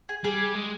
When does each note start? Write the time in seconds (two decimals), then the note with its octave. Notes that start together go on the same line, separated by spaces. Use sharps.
0.09 G#4
0.24 G3 G#4
0.55 G#3